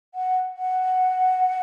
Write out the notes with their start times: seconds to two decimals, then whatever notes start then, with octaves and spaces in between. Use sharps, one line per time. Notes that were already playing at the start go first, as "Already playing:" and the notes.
0.15 F#5
0.57 F#5